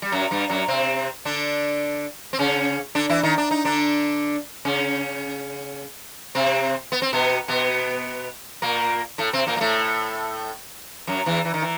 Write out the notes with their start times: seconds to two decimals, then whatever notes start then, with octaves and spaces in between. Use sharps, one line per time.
0.02 G3
0.12 F#2 F#3
0.31 G2 G3
0.49 F#2 F#3
0.68 C3 C4
1.25 D3 D4
2.33 C4
2.39 C#3 C#4
2.95 D3 D4
3.09 E3 E4
3.23 D#3 D#4
3.38 D4
3.51 D#4
3.65 D3 D4
4.65 C#3 C#4
6.35 C3 C4
6.92 B3
7.02 C4
7.13 B2 B3
7.48 B2 B3
8.62 A#2 A#3
9.18 A2 A3
9.33 C3 C4
9.47 A#2 A#3
9.57 A#3
9.61 A2 A3
11.07 F#2 F#3
11.26 E2 E3
11.45 E3
11.54 D#3
11.62 E3